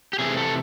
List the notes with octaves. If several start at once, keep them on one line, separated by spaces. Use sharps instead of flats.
G4
C3 E3 A3 C4 G#4
A4